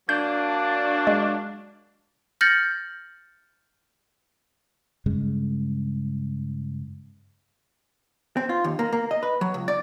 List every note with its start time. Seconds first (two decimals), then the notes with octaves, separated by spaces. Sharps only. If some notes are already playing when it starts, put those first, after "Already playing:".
0.09 F#3 A#3 D4 G6
1.07 G#3
2.41 F6 G6 A6 A#6 C#7 F#7
5.06 G2 C#3 G#3
8.37 C4
8.49 F4
8.64 D#2
8.79 A#3
8.93 A#3
9.11 D#5
9.23 B4
9.41 F#3
9.54 C#2
9.68 D5